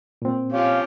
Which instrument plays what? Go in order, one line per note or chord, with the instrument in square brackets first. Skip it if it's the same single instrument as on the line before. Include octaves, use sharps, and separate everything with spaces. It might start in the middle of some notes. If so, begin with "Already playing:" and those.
[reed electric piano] A#2 C4
[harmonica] F3 G4 [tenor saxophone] C#4 [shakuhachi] F5